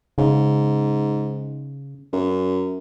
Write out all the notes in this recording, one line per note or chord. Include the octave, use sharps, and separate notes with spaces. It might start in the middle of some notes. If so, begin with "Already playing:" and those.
G#2 C#3
F#2